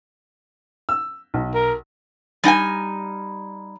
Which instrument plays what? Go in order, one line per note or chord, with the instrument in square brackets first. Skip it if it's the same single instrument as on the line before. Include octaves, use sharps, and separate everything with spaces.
[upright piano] E6
B1
[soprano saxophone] A#4
[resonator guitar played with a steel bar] G3 D#4 G5 G#5